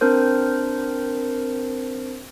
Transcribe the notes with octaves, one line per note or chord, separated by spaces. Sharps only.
C4 D4 A#4 C5